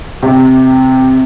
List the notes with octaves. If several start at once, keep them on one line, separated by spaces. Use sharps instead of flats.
C3